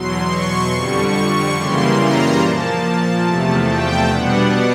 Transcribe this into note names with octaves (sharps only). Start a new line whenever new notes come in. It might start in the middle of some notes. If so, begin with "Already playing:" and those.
Already playing: E2 B2 F#3 C6
C#6
F2 D3 G3
C#6
F#2 C#3 E3 G3 A#3 C6
A#5
A#2 F3 A#3 A5
E2 C3 F3 A3
G5
B2 G3 B3 D4 F#5